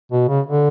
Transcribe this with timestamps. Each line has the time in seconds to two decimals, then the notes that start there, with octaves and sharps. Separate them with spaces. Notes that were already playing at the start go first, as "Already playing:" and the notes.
0.12 B2
0.28 C#3
0.47 D3